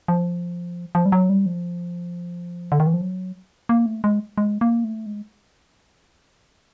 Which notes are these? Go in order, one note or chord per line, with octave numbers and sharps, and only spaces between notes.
F3
F3
G3
F#3
G3
F3
D3
D#3
E3
F3
F#3
A#3
A3
G#3
G#3
A#3
A3
G#3